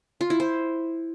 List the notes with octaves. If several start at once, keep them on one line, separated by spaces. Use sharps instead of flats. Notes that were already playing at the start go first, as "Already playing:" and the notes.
F4
E4
C5